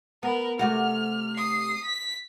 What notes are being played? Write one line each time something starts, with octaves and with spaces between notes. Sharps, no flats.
B3 A#4 B4
C3 A3 F#4 F6
D#6 C7
B6